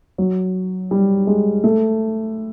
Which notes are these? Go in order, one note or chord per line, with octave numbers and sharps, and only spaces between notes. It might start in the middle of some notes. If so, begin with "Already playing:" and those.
F#3
G3
G#3
A3